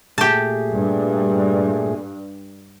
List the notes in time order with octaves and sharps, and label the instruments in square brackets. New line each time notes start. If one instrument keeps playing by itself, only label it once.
[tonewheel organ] A#2 A3 G#4 [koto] G4 A5
[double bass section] G2